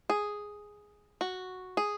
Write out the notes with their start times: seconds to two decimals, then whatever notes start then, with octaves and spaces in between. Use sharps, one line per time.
0.10 G#4
1.21 F#4
1.77 G#4